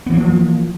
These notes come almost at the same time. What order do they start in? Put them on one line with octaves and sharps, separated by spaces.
B3 E3 A#3 F3